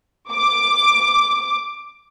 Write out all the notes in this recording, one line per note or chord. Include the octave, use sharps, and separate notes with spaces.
D6